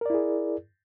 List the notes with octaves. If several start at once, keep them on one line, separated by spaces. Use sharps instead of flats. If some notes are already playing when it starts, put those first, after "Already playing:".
E4 G#4 A#4 D5